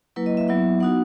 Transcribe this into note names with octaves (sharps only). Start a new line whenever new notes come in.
F#3 A#3 E4 B4
D#5
E5
F#3 B3 E4 E5
B3 D#4 F#4 F#5